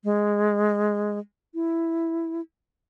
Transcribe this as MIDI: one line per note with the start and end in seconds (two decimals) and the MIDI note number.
0.04 1.19 56
1.54 2.41 64